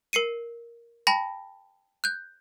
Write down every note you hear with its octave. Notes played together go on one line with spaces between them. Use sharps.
A#4 C7 C#7 D#7
G5 A5 B5 A#6
F#6 G6